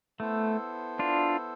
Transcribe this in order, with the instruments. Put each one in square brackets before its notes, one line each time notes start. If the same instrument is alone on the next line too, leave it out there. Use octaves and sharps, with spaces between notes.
[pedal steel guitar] A3 [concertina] B3 E4 A4 C5
[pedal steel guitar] D4 F4